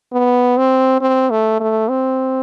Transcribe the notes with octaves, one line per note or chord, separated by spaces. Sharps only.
B3
C4
C4
A3
A3
C4